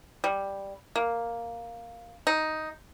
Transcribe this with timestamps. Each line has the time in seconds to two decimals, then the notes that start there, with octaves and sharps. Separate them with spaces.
0.24 G3
0.96 A#3
2.27 D#4